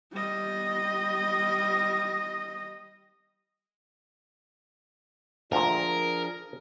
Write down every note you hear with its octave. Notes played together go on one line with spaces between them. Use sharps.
G3 D#5
D2 A#2 F3 D4 G#4 A#4